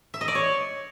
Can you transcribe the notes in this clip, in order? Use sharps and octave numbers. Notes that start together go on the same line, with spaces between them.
E5
D#5
D5
C#5